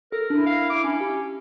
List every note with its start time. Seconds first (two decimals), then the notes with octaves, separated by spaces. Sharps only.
0.12 A4 A#4
0.30 D4 E4
0.46 F5
0.70 D6
0.84 C#4 D4
1.01 G4